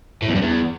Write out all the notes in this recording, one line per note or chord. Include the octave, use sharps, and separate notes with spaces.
A2
E2
G2
E2